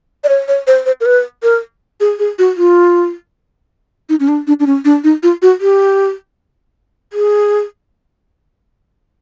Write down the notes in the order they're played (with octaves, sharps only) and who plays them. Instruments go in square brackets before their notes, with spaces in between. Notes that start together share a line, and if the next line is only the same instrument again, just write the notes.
[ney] D5
C#5
C#5
C5
C5
A#4
B4
A#4
G#4
G#4
F#4
F4
D#4
C#4
D4
D4
D4
C#4
D4
D#4
F4
F#4
G4
G#4